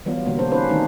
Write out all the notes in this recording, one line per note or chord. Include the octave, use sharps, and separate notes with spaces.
E3 F#3 G3 B3 F4
B2 D3 F#3 G3 A#3
B2 D4 C5
C#4 D#4 B4 C5
D#3 A3 C4 D4 D#4